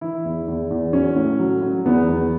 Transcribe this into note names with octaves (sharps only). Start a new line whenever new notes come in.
E3 E4
E2
E2
E2
F#3 C#4
A2
F#3
F#3
E2 B3
E2